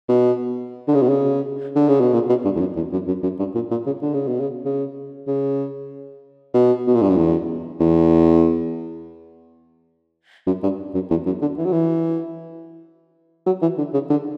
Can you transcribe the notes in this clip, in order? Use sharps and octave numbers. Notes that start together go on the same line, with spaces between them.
B2
D3
C#3
B2
C#3
D3
C#3
B2
A#2
B2
G2
E2
F#2
E2
F#2
F#2
F#2
G2
A#2
A#2
C#3
D3
C#3
B2
C#3
C#3
C#3
B2
B2
A#2
G2
F#2
E2
E2
F#2
G2
F#2
E2
F#2
D3
E3
F#3
E3
F#3
E3
D3
C#3
D3